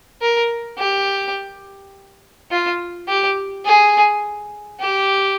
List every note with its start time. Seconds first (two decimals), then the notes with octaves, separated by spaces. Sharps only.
0.22 A#4
0.78 G4
2.51 F4
3.08 G4
3.65 G#4
4.80 G4